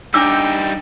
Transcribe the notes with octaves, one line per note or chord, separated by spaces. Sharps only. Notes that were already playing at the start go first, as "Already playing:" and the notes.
G3 D4 D#4 G5 D6 E6